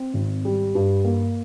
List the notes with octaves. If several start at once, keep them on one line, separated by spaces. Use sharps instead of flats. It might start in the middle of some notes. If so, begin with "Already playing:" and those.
Already playing: C4
G#1
G3
G2
A#3